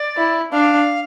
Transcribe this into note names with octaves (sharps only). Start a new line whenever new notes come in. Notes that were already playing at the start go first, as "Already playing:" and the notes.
Already playing: D5
E4
D4 F5